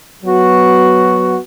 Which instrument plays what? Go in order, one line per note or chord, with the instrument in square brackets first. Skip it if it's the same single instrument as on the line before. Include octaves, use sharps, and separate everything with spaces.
[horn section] F#3 B3 F#4